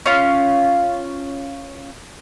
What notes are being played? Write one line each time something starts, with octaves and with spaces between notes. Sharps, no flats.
C#4 F4